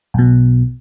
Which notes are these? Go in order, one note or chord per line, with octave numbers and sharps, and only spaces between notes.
B1 B2